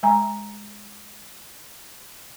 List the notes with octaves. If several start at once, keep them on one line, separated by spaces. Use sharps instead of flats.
G#3 G#5 A#5